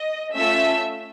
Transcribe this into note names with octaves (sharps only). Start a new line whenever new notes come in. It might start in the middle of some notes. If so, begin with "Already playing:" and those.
Already playing: D#5
A3 C#4 F4 A4 E5